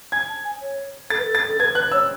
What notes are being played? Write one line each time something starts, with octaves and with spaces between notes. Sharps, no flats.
G#5 G#6
A5
G#5
C#5
A4 A6
B4
A4
A6
A4
B4 G#6
B4 F#6
C#5 E6